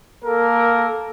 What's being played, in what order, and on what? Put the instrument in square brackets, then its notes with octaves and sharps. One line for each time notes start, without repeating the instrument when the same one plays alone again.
[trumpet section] A#3 A4 A#4